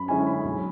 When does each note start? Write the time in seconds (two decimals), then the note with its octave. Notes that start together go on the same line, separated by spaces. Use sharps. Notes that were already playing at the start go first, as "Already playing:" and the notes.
Already playing: F#2 B5
0.08 D3 G#3 C#4 E4 G#5
0.27 B5
0.44 B1